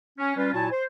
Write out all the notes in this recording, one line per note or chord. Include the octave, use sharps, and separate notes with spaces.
C#4
G3 C#4 F4 B4
A#2 F#3 E4 F#4 G#5 A5
C5